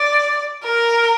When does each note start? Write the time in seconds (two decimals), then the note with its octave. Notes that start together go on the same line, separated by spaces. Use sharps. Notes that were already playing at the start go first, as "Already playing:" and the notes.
Already playing: D5
0.63 A#4